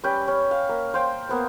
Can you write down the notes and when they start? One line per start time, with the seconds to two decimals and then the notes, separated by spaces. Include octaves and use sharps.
0.04 G3 C#4 B4 G5
0.28 C#4
0.51 F5
0.69 A#3
0.94 C5 F5 G5
1.29 A#3 B3 C5